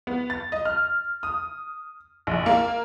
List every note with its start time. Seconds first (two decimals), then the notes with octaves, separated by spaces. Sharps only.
0.07 B3
0.30 A6
0.52 D#5
0.65 F6
1.23 D#6
2.27 A#1
2.46 A#3